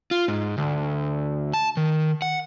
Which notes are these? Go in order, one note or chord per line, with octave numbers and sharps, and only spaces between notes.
F4
G#2
D2
A5
D#3
F#5